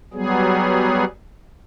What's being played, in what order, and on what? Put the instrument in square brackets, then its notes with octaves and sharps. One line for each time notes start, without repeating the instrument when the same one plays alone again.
[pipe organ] F#3 G3 B3 G#4